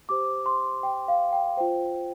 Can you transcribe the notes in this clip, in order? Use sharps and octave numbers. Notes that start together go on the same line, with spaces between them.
G4 C5 D6
C6
G5
F5
G5
F4 C5 G5